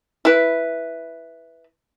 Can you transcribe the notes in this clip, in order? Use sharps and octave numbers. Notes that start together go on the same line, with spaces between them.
E4 B4